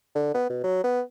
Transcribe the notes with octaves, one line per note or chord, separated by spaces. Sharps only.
D3
B3
B2
F#3
B3